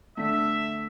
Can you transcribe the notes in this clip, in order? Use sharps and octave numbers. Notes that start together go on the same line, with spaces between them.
D3 A3 E5